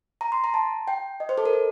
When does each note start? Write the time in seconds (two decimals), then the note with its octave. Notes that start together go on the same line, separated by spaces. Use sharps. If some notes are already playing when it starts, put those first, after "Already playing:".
0.21 A#5
0.32 C6
0.44 A#5
0.54 A5
0.87 G5
1.20 D#5
1.29 C5
1.38 A4
1.45 A#4
1.53 A4